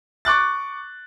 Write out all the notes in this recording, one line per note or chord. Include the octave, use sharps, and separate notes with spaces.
C#6 D6 F#6 A6